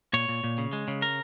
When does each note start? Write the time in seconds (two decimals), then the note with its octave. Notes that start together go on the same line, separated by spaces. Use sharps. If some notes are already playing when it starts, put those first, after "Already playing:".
0.13 A#2 C#5
0.29 A#2
0.44 A#2
0.58 C#3
0.73 G#3
0.88 C#3
1.02 A#4